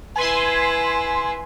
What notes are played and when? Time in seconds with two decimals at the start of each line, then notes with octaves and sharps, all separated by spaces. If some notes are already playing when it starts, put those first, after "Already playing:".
0.16 E4 B4 G#5 C6